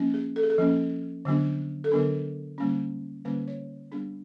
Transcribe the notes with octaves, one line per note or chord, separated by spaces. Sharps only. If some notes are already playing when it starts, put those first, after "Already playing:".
Already playing: F3 A#3 C#4
G#4
A4
G#4
A4
F3 A#3 C#4
D3 F#3 B3 D4
A4
D3 F#3 B3 D4 A#4
D3 G3 A#3 C#4
D3 G3 A#3 C#4 B4
C#5
G3 B3 D4 G#4